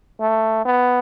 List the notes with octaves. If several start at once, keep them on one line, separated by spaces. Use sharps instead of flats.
A3
B3